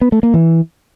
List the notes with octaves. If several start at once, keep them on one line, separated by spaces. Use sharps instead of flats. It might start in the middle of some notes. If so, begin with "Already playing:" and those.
B3
A3
A#3
E3